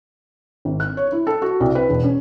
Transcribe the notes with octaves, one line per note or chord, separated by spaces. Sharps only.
G#1
F#6
C#5
E4
A4
F#4
C2
B4
E1
C#4